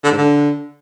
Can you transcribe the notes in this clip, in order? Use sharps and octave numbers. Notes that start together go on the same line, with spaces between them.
D3
G#2
D3